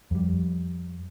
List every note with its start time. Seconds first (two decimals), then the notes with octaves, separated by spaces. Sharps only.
0.11 F2 G3